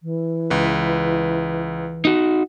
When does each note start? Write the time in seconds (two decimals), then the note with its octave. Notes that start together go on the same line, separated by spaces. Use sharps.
0.03 E3
0.50 C#2 B4
2.05 D#4 F#4